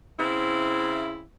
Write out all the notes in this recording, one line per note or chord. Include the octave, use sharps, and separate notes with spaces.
C#3 C4 E4